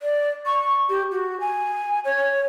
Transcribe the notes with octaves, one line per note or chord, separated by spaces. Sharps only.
D5
C#6
G4
F#4
G#5
C#5